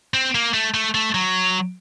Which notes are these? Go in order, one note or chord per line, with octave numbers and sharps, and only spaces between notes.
C4
A#3
A3
A3
A3
F#3